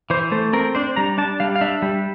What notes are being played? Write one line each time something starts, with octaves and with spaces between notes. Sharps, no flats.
E3 C5
A3 C5
C4 A#4
D4 C5
G3 A#5
D4 A5
G3 F5
F5
D4 E5
G3